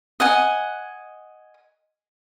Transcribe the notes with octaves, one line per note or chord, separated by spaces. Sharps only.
D#5 F#5 G#5